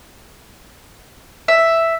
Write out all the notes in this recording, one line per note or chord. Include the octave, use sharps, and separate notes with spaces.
E5